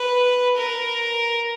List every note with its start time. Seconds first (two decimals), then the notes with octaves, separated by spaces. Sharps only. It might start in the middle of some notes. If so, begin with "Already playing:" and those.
Already playing: B4
0.56 A#4